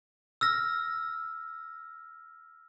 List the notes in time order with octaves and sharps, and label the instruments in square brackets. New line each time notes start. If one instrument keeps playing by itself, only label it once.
[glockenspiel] E6 F6 A#6